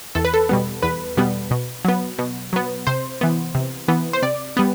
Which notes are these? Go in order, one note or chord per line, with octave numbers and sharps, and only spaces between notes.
E2 A4
B4
A4
B2 G3 B3
E2 B4
B2 G3 B3
B2
F#3 B3
B2
F#3 B3
C3 C5
E3 B3
C3
E3 B3
C5
C3 D5
G3 B3